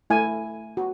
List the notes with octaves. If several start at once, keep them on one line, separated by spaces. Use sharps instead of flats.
A3 E4 G#5
F#4